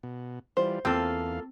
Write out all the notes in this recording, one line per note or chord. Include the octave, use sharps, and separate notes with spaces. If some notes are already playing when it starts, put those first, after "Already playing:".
B2
E3 G3 F4 C5
E2 A#3 C4 F4 A4 F5